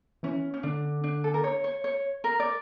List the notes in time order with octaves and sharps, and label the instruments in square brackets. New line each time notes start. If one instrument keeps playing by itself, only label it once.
[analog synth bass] E3 [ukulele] C#4
[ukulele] C#4
[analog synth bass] D3 [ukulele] D4
[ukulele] D4
A4
A#4
C#5
C#5
C#5
A#4
D5